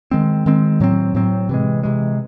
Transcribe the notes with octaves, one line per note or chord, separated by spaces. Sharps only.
D#3 G#3 C4
D#3 G#3 C4
A2 F#3 C4
A2 F#3 C4
C3 E3 G#3
C3 E3 G#3